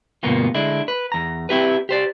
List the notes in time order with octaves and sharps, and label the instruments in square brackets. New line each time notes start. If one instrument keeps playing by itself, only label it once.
[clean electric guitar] D2 G2 B2 A#3 B3 F4
D3 G#3 D4 E4
B4
E2 A#5
C4 E4 G4 B4
G4 C5 D5